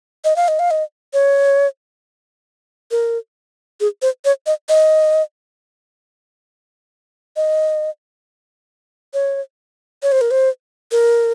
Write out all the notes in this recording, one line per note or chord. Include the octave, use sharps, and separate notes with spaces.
D#5
F5
D#5
F5
D#5
C#5
A#4
G#4
C5
C#5
D#5
D#5
D#5
C#5
C#5
C5
A#4
C5
A#4